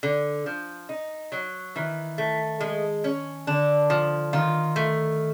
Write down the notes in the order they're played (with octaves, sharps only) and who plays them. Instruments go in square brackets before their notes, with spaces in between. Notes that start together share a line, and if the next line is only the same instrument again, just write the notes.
[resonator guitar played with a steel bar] D3
F3
D#4
F#3
[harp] D#3 [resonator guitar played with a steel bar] E3
[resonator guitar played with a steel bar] A3
G#3
C#4
[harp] D3 [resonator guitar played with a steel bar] D4
[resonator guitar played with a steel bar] F3
[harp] D#3 [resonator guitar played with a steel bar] F4
[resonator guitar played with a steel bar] A3